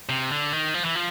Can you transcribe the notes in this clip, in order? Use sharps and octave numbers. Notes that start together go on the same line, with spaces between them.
C3
D3
D#3
F3
E3
F3